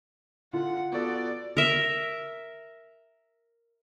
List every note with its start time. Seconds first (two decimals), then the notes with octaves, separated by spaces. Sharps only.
0.53 D3 F4 F#5
0.92 B3 F#4 A4 D5
1.57 A#4 E5